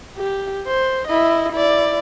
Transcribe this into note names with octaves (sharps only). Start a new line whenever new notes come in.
G4
C5
E4 D#5
E4 D5